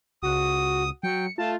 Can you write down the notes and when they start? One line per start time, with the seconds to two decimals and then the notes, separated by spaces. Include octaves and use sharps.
0.23 C#2 F#4 D#6
1.03 F#3 G5 C#7
1.38 A3 F4 A5